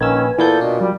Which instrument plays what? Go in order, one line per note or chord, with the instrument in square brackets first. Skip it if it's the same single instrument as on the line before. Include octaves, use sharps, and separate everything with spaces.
[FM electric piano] A#1 A#3 E6 [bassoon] D#3 [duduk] C#4 [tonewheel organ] B4 G#5
[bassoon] A#2 [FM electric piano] E3 B3 G6 [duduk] A4
[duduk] B2 [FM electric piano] D4
[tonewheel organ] F#3 [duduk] G3